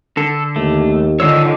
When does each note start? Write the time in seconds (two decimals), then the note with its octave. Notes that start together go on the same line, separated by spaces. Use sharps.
0.17 D3 A4
0.56 D#2 A3
1.20 D3 D#3 F4 C#5 E6